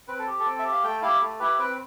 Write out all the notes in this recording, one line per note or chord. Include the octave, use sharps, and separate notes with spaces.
C4 B4
A4
G4
A4
C4
G4 E5
F5
A3 G5
E4 G4 F5
A3
E4 G4 B4
C4 B4